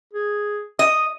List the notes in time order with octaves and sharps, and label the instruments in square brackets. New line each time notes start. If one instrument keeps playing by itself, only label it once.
[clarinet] G#4
[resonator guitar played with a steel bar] D#5 [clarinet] D#6